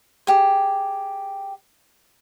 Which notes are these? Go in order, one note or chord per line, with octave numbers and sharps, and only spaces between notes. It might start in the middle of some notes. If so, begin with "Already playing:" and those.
G4 G#4